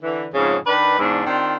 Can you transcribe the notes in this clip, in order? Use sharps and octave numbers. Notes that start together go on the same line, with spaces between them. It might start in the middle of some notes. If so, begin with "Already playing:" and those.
D3 E3
F2 G#2 C#3
D#3 D4 B4
E2 G#2 D4
D#3 C4 D4 F4